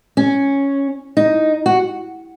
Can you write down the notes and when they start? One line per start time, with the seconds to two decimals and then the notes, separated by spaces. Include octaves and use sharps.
0.17 C#4
1.17 D#4
1.66 F#4